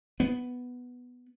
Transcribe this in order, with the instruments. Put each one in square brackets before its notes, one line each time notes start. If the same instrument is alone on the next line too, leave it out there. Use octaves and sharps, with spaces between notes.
[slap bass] B3